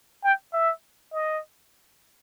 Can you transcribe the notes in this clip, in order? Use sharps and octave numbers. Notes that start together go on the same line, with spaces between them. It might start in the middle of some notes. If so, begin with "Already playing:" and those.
G5
E5
D#5